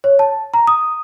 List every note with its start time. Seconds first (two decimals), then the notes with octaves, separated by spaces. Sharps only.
0.04 C#5
0.19 A5
0.54 A#5
0.67 D#6